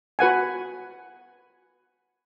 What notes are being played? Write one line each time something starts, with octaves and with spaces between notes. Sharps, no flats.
F#4 B4 F#5 G#5